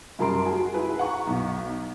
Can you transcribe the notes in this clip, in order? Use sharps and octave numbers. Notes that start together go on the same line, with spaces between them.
F#2 G3 A#4 A5 C6 D7
F#4 G#4
E4 G#4 B4
F#5 A#5 C#6
B1